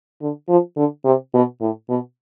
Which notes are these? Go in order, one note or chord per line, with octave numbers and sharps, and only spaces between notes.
D3
F3
D3
C3
B2
A2
B2